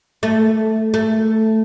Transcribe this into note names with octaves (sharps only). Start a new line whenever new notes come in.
A3
A3